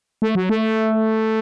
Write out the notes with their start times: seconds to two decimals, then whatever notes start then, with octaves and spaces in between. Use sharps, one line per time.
0.22 A3
0.35 F#3
0.49 A3